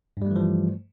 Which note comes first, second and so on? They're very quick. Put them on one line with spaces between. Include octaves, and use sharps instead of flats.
G2 G3 A3 E3 F3